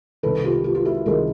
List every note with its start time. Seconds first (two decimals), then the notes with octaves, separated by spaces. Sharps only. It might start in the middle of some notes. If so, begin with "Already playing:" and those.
0.23 C2 C3 D#3 A4 B4
0.44 F4 G4
0.64 F4 G4
0.75 F4
0.85 E4 F#4
1.05 C2 C3 D#3 G#4 A#4